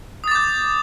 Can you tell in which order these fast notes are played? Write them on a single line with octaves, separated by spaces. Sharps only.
D#6 A6 D6 G6